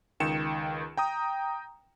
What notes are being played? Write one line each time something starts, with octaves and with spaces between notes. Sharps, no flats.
C#2 D#3 G5 C#7 E7
G5 A#5 D#6